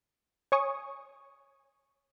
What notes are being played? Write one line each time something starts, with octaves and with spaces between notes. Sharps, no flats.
C#5 G#5 C#6 D#6